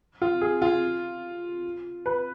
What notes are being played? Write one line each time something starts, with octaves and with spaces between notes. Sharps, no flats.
F4
G#4
F4
B4